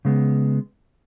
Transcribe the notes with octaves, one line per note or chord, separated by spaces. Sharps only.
C#3 G#3 B3